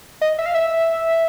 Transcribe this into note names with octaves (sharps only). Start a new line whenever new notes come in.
D#5
E5
F5
E5